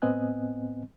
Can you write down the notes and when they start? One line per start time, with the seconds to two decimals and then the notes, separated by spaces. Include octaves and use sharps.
0.02 A2 B3 C4 D#5 G#5 F#6